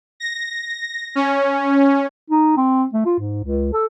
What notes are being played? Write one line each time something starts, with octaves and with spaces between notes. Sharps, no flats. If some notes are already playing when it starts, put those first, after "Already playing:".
A#6
C#4
D#4
C4
A3
F4
G#2
C#2
A4